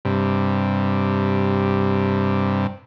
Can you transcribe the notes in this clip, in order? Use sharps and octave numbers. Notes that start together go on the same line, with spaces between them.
G2 C3